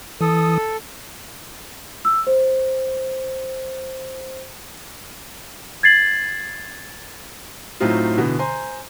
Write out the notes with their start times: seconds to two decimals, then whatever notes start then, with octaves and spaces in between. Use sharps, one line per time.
0.21 E3 A4 D#6
2.05 E6
2.27 C5
5.83 G#6 A6 C7 F#7
7.80 A2 F#3 A3 C4 D#4 F4
8.18 B2 D3 E3 B3
8.39 C5 G#5 A#5 C6